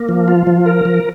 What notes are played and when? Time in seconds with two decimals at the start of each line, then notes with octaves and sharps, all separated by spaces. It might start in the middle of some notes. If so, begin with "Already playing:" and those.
Already playing: A#3
0.09 F3
0.28 F4
0.47 F3
0.66 A#4
0.85 F3